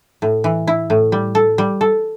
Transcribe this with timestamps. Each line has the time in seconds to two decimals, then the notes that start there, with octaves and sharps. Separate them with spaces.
0.22 A2
0.44 E3
0.67 E4
0.90 A2
1.12 G3
1.35 A4
1.58 G3
1.81 A4